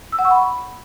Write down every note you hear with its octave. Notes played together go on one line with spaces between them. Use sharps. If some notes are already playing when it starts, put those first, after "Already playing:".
E6
F#5
C#6
B5